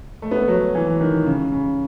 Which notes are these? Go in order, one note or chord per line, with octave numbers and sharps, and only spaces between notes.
A3
B3
A3
F#3
E3
D#3
C#3
C#3